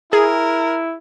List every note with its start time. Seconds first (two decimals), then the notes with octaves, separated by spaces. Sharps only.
0.13 E4 G#4 A#4